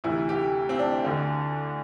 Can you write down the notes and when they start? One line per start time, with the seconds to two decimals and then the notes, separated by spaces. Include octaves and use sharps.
0.04 D2 C3 E3 E4
0.29 G4
0.69 C4
0.79 D4
1.04 D2 D3